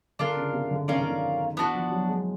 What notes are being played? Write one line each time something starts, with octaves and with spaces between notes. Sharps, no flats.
D3 D4 F4 A#4
C#3
C3
D3
D#3 C#4 F4 A#4 D5
D3
D#3
E3 B3 D4 F#4
F3
F#3
G#3